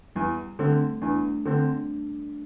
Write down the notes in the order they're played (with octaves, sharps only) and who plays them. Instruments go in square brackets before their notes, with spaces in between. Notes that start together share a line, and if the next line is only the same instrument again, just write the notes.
[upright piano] E2 [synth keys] G3
[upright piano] D3 C4 [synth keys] A3
[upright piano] E2 [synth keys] D4
[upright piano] D3 C4